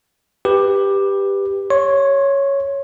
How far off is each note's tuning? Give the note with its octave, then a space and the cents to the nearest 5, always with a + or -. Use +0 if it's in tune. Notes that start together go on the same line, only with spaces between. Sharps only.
G4 +10 B4 +0
C#5 +0 C6 +35